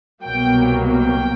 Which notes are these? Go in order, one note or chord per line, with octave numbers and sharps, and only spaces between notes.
C2 B2 F#3 A#3 G5
G5